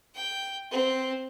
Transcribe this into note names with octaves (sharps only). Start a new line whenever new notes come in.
G5
C4